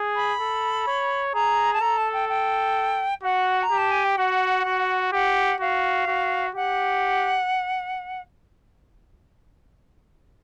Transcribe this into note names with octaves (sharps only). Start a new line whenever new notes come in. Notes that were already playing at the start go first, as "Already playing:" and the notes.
Already playing: G#4
B5
A4
C#5
G#4 A#5
A5
A4 A#5
A5
G5
G5
F#4 F#5
A#5
G4
A5
G#5
G5
F#4 F#5
F#4
G4 F#5
F#4 F5
F#4
G4 F#5